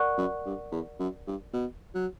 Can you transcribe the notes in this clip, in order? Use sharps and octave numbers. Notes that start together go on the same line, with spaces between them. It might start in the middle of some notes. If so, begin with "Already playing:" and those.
Already playing: A#4 D5 F#5 C#6 F#6
F#2
G2
E2
F#2
G2
B2
F#3